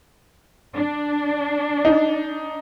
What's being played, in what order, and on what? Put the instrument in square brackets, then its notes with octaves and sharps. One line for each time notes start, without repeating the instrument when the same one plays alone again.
[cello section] D4
[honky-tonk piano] D#4